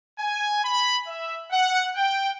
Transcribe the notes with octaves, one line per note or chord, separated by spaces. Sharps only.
G#5
B5
E5
F#5
G5